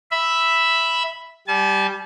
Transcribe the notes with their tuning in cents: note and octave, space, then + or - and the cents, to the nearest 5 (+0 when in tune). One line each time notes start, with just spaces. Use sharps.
E5 +0 B5 +0
G3 +0 A5 -45